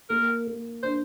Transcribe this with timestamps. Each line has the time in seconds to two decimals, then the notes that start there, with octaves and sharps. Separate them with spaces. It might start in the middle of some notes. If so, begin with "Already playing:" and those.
0.10 A#3 A#4
0.47 A#3
0.83 D4 C5